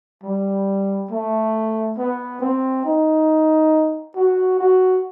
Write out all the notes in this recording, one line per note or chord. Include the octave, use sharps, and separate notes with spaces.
G3
A3
B3
C4
D#4
F#4
F#4